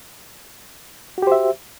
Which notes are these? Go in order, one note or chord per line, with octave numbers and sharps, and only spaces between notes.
F#4 G4 C5 E5